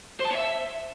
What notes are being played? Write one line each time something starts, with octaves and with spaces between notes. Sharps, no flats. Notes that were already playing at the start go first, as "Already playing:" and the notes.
C5
A5
C#5
E5